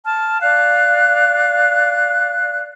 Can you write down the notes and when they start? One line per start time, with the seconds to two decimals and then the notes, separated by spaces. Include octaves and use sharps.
0.05 A5 F6
0.42 D5 F5 F#6